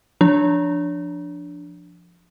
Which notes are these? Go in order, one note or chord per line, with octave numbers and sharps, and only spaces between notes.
F3 D4